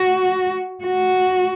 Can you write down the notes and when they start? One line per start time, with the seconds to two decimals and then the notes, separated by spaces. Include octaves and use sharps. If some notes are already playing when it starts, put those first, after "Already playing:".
Already playing: F#4
0.84 F#4